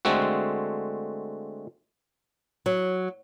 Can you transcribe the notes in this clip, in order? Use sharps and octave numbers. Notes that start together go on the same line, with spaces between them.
D3 G#3 A3 C4 F#4
F#3